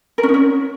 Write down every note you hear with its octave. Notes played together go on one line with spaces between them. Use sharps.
A#4
C#4
D#4
C#4